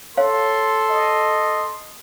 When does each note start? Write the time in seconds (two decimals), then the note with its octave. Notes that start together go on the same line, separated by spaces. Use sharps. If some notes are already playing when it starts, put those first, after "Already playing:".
0.17 A4 C#5 F5 C6
0.90 D#5